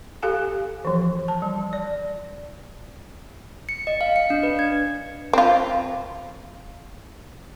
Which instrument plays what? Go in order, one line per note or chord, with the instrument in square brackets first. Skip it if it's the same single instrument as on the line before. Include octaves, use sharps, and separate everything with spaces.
[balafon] G4 A4 F5 G#5
E3 F3
A5
G3
D5
[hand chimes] C#7
D#5
F5
C#7
D4
B4
G#6
[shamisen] C4 F4